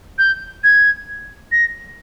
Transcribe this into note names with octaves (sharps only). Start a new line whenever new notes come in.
G6
G#6
A#6